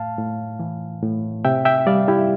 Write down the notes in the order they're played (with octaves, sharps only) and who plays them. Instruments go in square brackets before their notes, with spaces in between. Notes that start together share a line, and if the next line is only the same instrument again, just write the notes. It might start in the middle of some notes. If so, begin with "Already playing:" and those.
Already playing: [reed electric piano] A2 F5 A5
A2
E3
A2
C3 E5 G5
E5 G5
G3 D5 F5
E4 G4